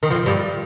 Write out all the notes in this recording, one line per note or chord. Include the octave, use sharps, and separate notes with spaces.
D#3
F2 F3
G2 G3